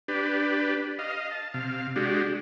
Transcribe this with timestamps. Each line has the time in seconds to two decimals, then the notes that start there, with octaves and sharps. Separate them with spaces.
0.08 D4 G4 B4
0.99 D#5 F5
1.31 A5
1.54 C3 F5
1.96 G#3 D4 F#4 G4